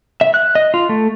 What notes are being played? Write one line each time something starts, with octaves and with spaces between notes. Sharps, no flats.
E5
F#6
D#5
F4
A3